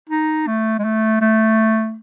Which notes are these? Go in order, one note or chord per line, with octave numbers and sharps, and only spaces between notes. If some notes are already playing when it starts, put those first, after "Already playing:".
D#4
A3
G#3
A3
A3